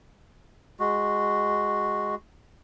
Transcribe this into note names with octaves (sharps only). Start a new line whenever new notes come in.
G#3 F#4